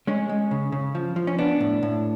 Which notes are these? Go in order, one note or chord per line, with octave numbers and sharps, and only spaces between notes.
G#3 C#4
G#3
C#3
C#3
F3
F3
C#4
B3 D4
A2
A2